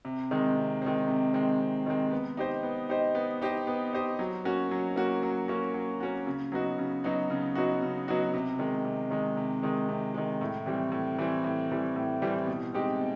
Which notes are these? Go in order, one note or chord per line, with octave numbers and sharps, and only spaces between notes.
C3
D#3 G#3 C4
C3
D#3 G#3 C4
C3
D#3 G#3 C4
C3
D#3 G#3 C4
B3
D#4 G4 C5 D#5
B3
D#4 G4 C5 D#5
B3
D#4 G4 C5 D#5
B3
D#4 G4 C5 D#5
F#3
A#3 C#4 F#4
F#3
A#3 C#4 F#4
F#3
A#3 C#4 F#4
F#3
A#3 C#4 F#4
C#3
F#3 B3 D#4 F#4
C#3
F#3 B3 D#4 F#4
C#3
F#3 B3 D#4 F#4
C#3
F#3 B3 D#4 F#4
C3
D#3 G#3
C3
D#3 G#3
C3
D#3 G#3
C3
D#3 G#3
A2
E3 G3 C4
A2
E3 G3 C4
A2
E3 G3 C4
A2
E3 G3 C4
B2
G#3 C4 D#4 G4
B2